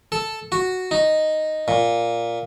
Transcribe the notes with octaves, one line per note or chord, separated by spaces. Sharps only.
A4
F#4
D#4
A#2